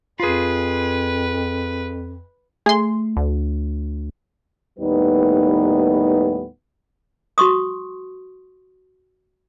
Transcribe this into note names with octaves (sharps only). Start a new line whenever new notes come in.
F2 F4 G#4 B4
A3 G#4 C6
D2
D#2 A2 G3 B3 D#4 B4
F#4 C6 C#6 D#6